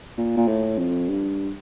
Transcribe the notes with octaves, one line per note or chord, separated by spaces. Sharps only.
A#2
A#2
A2
F2
G2